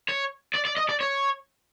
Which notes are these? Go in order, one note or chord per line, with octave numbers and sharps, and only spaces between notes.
C#5
D5
D5
D#5
D5
C#5